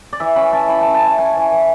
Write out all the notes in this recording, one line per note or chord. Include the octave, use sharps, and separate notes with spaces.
D5
E3 E5
C#4 B5
E4 A5
E4 B5
C#4 A5
A5
E4
A5
E4 G#5
E3
E3